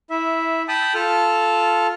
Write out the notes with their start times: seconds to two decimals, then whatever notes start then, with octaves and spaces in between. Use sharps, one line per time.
0.10 E4 E5
0.68 G5 A5 B5 D#6
0.95 F4 A4 A5 F6